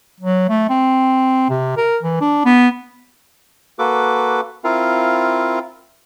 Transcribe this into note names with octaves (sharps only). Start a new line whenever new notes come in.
F#3
A3
C4
C3
A#4
E3
D4
B3
A#3 F#4 A4 B4 D6
C4 E4 F4 A#4 F5